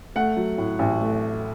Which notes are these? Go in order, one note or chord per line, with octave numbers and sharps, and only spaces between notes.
A3 F#5
F#3
A2
A1
A3